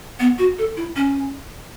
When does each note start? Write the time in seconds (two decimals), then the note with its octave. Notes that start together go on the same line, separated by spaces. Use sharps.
0.20 B3
0.39 F#4
0.59 A4
0.77 E4
0.96 C#4